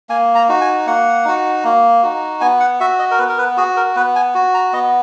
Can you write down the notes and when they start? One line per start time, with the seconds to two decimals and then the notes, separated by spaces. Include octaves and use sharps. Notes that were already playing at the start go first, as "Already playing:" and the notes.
0.09 A#3 G#5
0.35 A#5
0.48 D#4 F#4
0.61 G#5
0.87 A#3 F#5
1.25 D#4 F#4
1.64 A#3
2.03 D#4 F#4
2.41 B3 G#5
2.60 F#5
2.80 F#4 E5
2.99 D#5
3.11 A#4
3.18 B3 B4
3.29 A#4
3.39 B4
3.57 F#4 G#4
3.77 A#4
3.96 B3 B4
4.16 G#5
4.35 F#4
4.54 A#5
4.73 B3 D#5